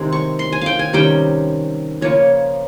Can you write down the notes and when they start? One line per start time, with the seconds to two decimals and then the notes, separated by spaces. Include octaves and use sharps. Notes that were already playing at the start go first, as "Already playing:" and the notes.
Already playing: C3 D#3 G#3 C4
0.12 C#6
0.39 C6
0.53 G#5
0.61 F5 G5
0.79 G#5
0.93 C3 D#3 G3 C#4 G5
2.01 C#3 F3 A#3 C#4 C#5